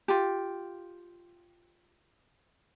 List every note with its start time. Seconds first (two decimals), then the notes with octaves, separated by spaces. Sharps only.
0.08 F4 G4